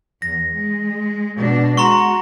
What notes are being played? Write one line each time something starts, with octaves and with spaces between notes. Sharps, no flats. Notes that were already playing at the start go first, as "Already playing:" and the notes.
E2 A#6
G#3
B2 D4
G#3 F#4 A#5 C6 C#6